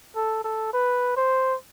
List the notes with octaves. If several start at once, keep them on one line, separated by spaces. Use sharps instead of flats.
A4
A4
B4
C5